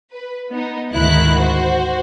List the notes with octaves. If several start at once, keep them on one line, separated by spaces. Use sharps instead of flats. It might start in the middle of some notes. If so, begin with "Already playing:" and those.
B4
B3 D#4
D2 G#2 D#3 E4 F#6
F#4 C5